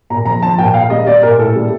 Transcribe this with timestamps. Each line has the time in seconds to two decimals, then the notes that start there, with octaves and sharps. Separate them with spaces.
0.10 A#2 A#5
0.26 F3 A#5
0.42 F3 A5
0.58 A#2 G5
0.74 A#2 F5
0.90 G3 D#5
1.07 G3 D5
1.23 A#2 A#4
1.39 A2 A4
1.55 G3